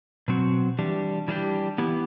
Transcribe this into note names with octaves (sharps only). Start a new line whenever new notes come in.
B2 F#3 C4 F#4
E3 G3 D4 G4
E3 G3 D4 G4
E3 B3 E4 G4